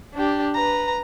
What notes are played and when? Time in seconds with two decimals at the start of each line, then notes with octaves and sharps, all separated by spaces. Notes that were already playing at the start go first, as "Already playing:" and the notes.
0.14 D4 G4
0.55 B4 A#5